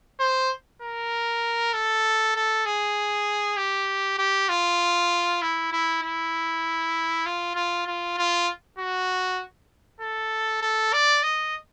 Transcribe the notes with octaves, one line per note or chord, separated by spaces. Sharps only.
C5
A#4
A4
A4
G#4
G4
G4
F4
E4
E4
E4
F4
F4
F4
F4
F#4
A4
A4
D5
D#5